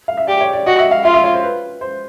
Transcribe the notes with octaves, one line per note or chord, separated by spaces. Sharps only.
F5
E5
G4 D5
C#5
D5
F#4 D#5
E5
F5
F4 F5
E5
C#5
C5
B4
C5